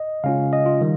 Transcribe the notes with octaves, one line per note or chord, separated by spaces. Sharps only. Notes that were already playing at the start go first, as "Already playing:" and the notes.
Already playing: D#5
C#3 G#3 C#4 F4 F5
D#5
F4
D#3 G3